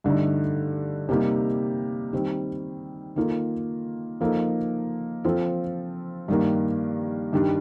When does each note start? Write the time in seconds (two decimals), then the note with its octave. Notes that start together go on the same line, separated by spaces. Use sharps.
0.04 G2 D3 A3 D#4
1.09 C3 G3 A#3 D#4 G4
2.13 D#3 G3 C4
3.16 D#3 A#3 F4 A4
4.21 F3 A#3 D#4 A4
5.24 F3 C4 F4 A4
6.28 G2 D#3 A#3
7.33 G2 D#3 G3 D4